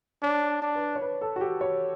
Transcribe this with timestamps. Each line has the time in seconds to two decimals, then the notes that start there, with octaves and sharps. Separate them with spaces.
0.23 D4 C#5
0.62 D4
0.75 B4
0.96 C#5
1.02 B4
1.21 A4
1.36 F#4
1.41 G4
1.61 C#5